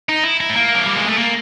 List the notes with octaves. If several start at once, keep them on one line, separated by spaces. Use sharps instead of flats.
D#4
E4
E4
A3
A#3
F#3
G3
G#3
A3
A#3